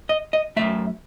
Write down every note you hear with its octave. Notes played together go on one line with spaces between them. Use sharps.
D#5
D#5
F#2 D#3 A3 E5